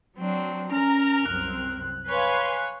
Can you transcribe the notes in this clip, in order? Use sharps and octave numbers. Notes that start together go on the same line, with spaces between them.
F#3 C4 D4
C#4 A#4 A#5 F6
C2 F#2 C4 F#6
B4 C#5 F5 G#5 C6